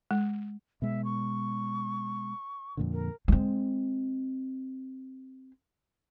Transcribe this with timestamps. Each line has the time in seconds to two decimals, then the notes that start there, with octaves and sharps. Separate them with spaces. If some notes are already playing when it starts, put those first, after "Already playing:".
0.11 G#3
0.82 B2 G#3 E5
1.05 C#6
2.77 F2 A#2 D3
2.93 A#4
3.28 G#3 C4